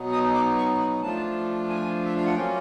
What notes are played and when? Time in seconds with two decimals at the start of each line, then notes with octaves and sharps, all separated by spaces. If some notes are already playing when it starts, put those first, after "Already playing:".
Already playing: B2 F#3 B3 D#4
0.12 D#6
0.34 D6
0.57 C#6
0.79 B5
1.01 F3 A3 D4 F4 A5
1.69 G#5
2.04 E5
2.16 F5
2.25 F#5
2.35 F#3 A#3 C#4 F4 G5